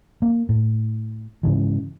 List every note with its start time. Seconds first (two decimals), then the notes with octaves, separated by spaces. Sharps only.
0.22 A#3
0.49 A2
1.43 G#2 C#3 E3